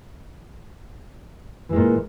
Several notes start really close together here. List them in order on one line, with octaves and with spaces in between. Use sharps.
E3 G#3 A#2